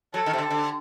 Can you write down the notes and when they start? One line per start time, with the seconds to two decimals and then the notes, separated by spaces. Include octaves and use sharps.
0.14 F#3 A4
0.26 D#3
0.33 C3
0.38 D3
0.50 D3